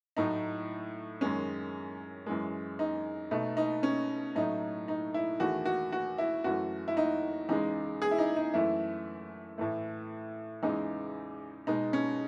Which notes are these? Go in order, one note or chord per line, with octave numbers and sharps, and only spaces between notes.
A2 F#3 A3 D#4
F#2 D#3 G#3 C#4
F#2 E3 G#3
D#4
B2 A3 D#4
D#4
C#4
A2 F#3 A3 D#4
D#4
E4
E2 D#3 A3 F#4
F#4
F#4
E4
F#2 E3 A3 F#4
E4
D#4
E2 C#3 G#3 D#4
G#4
E4
D#4
D#4
F#2 E3 A3 E4
A2 E3 A3
E2 C#3 E3 G#3 D#4
B2 G#3 D#4
C#4